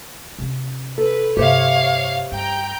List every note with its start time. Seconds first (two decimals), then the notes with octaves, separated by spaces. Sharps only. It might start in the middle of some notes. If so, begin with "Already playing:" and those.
0.39 C3 C#4
0.98 A4 B4
1.37 G2 C3 G4 C5 C#5 E5 F5
2.32 G2 G5 A#5 G6